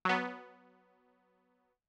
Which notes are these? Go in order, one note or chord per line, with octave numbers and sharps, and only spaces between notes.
F#3 B3